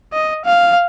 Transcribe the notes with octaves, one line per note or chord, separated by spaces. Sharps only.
D#5
F5